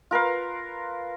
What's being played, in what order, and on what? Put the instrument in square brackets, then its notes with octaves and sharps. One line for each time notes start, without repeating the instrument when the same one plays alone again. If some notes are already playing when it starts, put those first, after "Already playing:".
[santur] F4 A#4 B4 F5